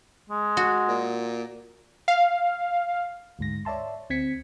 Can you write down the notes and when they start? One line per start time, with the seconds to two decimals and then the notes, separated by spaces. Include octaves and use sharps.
0.30 G#3
0.57 F#4
0.88 A#2
2.08 F5
3.39 D2 G#2 A#6
3.65 C#5 D5 E5 A5 C6
4.10 D2 C4 G#6 B6 C#7